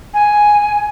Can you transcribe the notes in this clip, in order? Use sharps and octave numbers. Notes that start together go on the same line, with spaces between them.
G#5